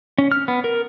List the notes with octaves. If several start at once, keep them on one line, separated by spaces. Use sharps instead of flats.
C#4
F6
B3
A#4